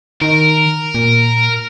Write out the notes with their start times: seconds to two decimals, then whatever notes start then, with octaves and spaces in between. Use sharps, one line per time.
0.22 D#3 A#4
0.95 A#2